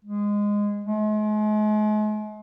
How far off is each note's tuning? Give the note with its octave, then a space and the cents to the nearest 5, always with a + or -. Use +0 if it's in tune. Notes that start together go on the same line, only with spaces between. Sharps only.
G#3 -15
G#3 +40